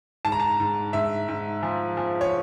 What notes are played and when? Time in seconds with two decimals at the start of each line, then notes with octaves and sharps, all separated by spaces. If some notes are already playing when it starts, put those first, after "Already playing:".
0.25 G#2 A5
0.32 A#5
0.40 A5
0.60 G#2
0.93 G#2 E5
1.28 G#2
1.63 F3
1.97 F3
2.21 C#5